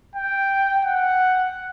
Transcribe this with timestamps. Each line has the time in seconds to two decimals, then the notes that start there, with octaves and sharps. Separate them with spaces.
0.15 G5
0.85 F#5